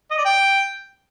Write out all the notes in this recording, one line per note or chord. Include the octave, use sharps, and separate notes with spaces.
D#5
D5
G5